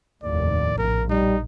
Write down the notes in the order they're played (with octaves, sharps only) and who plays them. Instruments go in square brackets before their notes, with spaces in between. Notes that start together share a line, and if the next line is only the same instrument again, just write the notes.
[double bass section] F1 D#2 A2 [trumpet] D5
[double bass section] A#1 [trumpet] A#4
[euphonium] G3 [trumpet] D#4